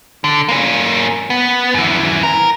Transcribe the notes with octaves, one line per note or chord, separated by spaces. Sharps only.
D3
A#3 C#4
B3
F#2 E3
A#4